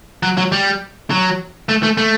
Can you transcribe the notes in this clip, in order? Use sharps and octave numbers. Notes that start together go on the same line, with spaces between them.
F#3
F#3
G3
F#3
A3
A3
A3